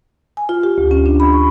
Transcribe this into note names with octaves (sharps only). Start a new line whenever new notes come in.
G#5
F4
G4
D2
C#4
D4
B5
C#6